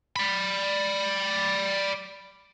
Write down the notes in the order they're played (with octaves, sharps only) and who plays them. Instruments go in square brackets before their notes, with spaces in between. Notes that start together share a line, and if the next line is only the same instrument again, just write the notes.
[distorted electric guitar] D5 B5